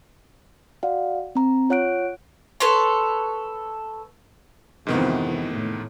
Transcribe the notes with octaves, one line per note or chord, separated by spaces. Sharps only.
F#4 D5 F5 F#5
C4 A#5
F4 C#5 F#5 F#6 D7
A4 B4 C#5 C6
F2 G#2 C3 D#3 E3 B3
A2